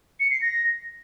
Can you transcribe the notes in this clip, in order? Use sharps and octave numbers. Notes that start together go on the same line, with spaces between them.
C#7
C7
A#6